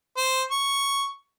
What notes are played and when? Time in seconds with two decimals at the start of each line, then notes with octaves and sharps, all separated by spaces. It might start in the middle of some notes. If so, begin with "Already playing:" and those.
0.17 C5
0.51 C#6